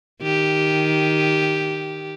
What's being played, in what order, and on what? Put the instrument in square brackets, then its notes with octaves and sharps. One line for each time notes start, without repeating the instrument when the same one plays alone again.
[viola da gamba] D#3 G4